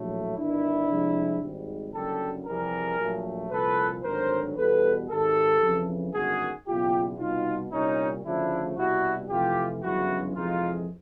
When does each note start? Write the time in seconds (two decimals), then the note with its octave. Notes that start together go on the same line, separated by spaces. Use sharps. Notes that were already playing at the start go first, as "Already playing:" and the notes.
Already playing: A#1 A2 F#3 A3
0.36 G1 G2 D#3 D4 E4
0.88 C2 C3 F3 G#3
1.41 G#1 G#2 D#3 G3
1.93 F#1 F#2 D3 G3 G4 A4
2.46 F2 C3 E3 G3 G#4 A#4
2.99 A#1 A#2 F#3 A3
3.51 C2 A#2 F3 A4 B4
4.04 G#1 G2 D3 F#3 A#4 C5
4.56 E2 B2 G3 A4 B4
5.09 G#1 G#2 D#3 G4 A4
5.62 F2 C#3 E3
6.14 G1 F#2 D#3 G#3 F#4 G#4
6.67 F#1 E2 B2 F4 G4
7.19 C2 B2 G3 D#4 F4
7.72 C2 A#2 G3 C#4 D#4
8.24 D2 C#3 F3 A3 D4 E4
8.77 C2 B2 G3 E4 F#4
9.29 F2 C3 E3 A3 F4 G4
9.82 G1 F#2 C#3 E3 G#3 E4 F#4
10.35 F2 C3 E3 G#3 D#4 F4